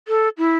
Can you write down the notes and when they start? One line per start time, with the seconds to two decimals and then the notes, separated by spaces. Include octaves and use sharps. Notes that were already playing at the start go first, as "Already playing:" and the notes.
0.08 A4
0.38 E4